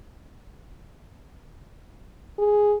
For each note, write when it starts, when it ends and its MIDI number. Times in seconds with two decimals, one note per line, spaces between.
2.38 2.75 68